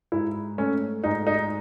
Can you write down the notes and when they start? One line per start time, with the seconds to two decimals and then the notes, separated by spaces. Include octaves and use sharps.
0.12 G#2 E4
0.58 A3 C#4
1.04 G#2 D#4
1.27 D#4